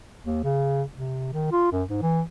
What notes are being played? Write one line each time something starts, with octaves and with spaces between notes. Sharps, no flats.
D#2
C#3
C3
D#3
F4
F#2
G#2
E3